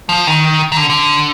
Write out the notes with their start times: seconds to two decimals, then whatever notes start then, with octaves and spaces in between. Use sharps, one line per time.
0.09 F3
0.27 D#3
0.72 D#3
0.77 D3
0.90 D3